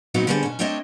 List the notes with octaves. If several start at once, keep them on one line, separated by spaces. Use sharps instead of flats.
A#2 F#3 B3 C4 D#4 F#4
D3 G3 B3 G#4 A4 C5
B2 C#4
A3 C4 D4 C5 C#5 D#5